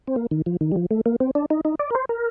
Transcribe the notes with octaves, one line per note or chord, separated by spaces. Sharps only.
C4
A#3
D#3
F3
D#3
G3
F3
A3
A#3
C4
D4
D#4
D#4
D5
A#4
C5
A#4